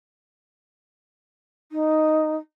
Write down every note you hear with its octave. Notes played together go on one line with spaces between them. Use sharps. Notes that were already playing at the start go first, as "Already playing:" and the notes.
D#4